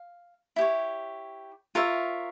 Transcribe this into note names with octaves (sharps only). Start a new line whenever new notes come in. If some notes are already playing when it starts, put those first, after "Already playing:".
Already playing: F5
E4 G4 C#5
F4 A#4 C#5 E5